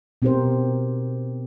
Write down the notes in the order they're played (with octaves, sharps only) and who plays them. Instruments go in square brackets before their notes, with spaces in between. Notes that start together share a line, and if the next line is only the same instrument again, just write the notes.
[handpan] B2 C4 D#4 G4 A#4 C5